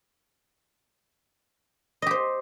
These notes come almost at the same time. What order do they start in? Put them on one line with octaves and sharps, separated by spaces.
D#5 G4 C5